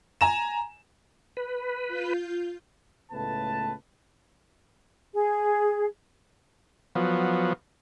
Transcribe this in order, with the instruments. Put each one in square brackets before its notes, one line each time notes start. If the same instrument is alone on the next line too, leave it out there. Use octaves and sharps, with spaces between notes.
[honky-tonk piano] G#5 A#5 E7
[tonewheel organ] B4
[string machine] F4 G6
[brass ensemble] C#2 A2 A3 B3 B4 A5
[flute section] G#4
[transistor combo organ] F3 F#3 B3